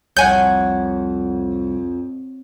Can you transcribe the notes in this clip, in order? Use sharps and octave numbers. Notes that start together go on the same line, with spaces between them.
C2 F2 C#5 F#5 G#5 G6